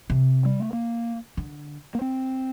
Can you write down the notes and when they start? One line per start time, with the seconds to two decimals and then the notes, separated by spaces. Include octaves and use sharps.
0.10 C3
0.45 G3
0.60 A3
0.73 A#3
1.37 D3
1.95 A#3
2.01 C4